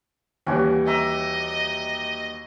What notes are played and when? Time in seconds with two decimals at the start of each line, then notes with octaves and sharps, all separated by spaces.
0.47 D#2 E3 G3 C#4 F#4
0.87 D#5 E5 A#5 D6